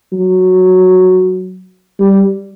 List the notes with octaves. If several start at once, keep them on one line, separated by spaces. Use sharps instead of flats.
F#3
G3